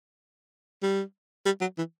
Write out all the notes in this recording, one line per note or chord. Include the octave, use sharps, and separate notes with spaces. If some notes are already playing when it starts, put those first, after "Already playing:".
G3
G3
F#3
E3